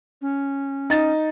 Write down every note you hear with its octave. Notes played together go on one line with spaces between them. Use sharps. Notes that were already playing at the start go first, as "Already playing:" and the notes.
C#4
D#4 A6